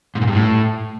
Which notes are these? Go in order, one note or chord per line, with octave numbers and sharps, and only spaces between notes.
G#2
A#2
G2
A2